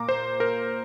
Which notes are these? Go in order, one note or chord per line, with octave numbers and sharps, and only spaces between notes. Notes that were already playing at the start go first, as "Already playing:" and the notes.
Already playing: A#2 A#3 A#5 D6
C5
A#4